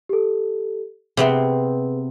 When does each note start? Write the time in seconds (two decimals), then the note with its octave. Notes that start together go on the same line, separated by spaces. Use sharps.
0.09 G4 A4
1.17 C3 B3 C4 G#4 B4